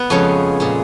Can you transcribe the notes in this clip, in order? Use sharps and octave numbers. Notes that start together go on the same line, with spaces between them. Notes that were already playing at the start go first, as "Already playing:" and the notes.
Already playing: B3
F2 C#3 G#3 C#4
A#2 G#3